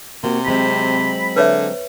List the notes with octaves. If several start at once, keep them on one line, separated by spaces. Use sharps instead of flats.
C3 A#3 F#4
F#3 G#3 C4 B5
D3 B4 C#5 E5